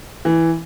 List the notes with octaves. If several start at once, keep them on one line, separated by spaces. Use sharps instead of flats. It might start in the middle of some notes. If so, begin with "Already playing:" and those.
E3